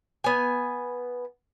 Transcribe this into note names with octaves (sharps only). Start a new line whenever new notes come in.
B3 G#5